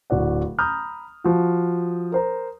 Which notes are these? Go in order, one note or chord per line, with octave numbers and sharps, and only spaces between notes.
D1 F#4 D5 F#5
A#5 B5 D#6 F6 G6
F3 F#4
A#4 C5 A#5